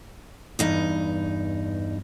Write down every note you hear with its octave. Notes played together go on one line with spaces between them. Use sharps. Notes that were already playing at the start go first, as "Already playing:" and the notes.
E2 G2 D#4